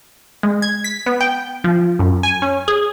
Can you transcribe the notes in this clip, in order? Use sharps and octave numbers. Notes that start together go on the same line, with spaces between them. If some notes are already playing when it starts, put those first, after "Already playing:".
G#3
G#6
B6
B3
G5
F3
F#2
G#5
C#4
G#4